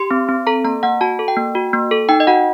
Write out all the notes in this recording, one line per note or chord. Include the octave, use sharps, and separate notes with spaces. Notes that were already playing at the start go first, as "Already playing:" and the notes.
Already playing: G4 C6
C4
C4
A4 A#5
A#3 A#5
A#3 F#5
F#4 A5
A4
G5
A#3
F#4
A#3
A4
D#4 G5
D#5
F#4 F#5